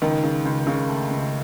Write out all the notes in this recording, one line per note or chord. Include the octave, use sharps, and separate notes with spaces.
C#2 D#3
C#3
C#2
C#3
A3
C#2